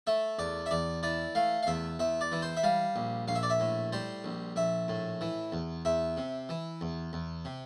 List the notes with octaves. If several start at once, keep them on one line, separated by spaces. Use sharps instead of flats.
A3 E5
E2 D5
E5
E2 D5
E3 D5
A3 F5
F5
E2 E5
E2 E5
D5
E3
C5
E5
G3 F5
A#1
A#1 F5
E5
D5
E5
A2
G3 C5
A#1
A#1 E5
A2
E3
E2
E2 E5
C3
E3
E2
E2
C3